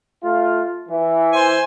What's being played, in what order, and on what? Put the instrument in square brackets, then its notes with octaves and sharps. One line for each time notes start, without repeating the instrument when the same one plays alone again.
[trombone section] A3 F4
E3
[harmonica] C5 G#5